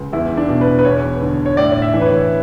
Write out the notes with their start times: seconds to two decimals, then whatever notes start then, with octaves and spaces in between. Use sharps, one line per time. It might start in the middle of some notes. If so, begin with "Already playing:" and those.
Already playing: C#2
0.13 E2 E4
0.37 D4
0.49 B2
0.61 B4
0.79 B4
0.85 E2 C#5
1.22 D3
1.46 C#5
1.57 A2 D5
1.72 D5
1.82 E5
1.94 E3
2.01 B4
2.06 C#5